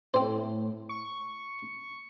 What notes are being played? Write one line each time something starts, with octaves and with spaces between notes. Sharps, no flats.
A2 C4 C5
C#6